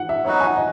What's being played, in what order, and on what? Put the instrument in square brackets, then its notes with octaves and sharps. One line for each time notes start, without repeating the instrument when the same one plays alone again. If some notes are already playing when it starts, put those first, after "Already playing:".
Already playing: [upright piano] F#5
E5
[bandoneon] F#3 B3 D#4 F#4 B4 [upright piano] C#5
[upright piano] G#5
D#5